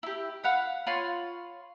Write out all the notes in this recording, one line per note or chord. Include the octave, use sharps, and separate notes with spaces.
E4 G4
F5 F#5 B5
F4 C#5 B5 C6